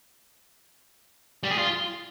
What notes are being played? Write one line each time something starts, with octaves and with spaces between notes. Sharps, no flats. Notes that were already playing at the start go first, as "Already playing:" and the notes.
G3
G#4
F4